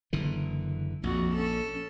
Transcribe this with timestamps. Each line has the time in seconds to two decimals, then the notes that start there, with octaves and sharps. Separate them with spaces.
0.13 F#1 D3 E3
1.04 A#1 F2 F#4
1.35 C#4 A4